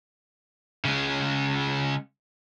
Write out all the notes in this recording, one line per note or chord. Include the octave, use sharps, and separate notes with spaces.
C#3 G#3